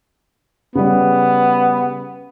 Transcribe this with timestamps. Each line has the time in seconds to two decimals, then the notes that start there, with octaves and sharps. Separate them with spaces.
0.75 C#3 G3 B3